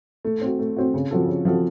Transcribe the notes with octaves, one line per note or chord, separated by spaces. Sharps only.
A3
C4 F#4
A3
C4 F#4
C#3
F3 C4 F#4 A4
C#3
F3 C4 F#4 A4